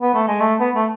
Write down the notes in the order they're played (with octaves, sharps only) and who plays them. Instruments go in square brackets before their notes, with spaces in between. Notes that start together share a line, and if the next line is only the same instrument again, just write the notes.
[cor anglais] B3
A3
G#3
A3
B3
A3